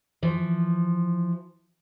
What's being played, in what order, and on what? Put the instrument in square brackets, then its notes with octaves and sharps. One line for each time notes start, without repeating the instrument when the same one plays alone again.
[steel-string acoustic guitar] E3 F3